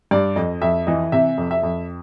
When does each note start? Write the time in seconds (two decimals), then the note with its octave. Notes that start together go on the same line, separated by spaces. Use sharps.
0.11 G2 D5
0.36 F2 D#5
0.61 F2 E5
0.87 E3 D#5
1.12 C3 E5
1.38 F2
1.51 E5
1.63 F2